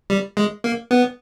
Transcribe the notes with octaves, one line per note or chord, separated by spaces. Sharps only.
G3
G#3
A#3
B3